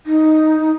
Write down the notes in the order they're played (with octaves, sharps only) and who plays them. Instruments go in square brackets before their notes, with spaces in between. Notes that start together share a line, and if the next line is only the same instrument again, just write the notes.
[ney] D#4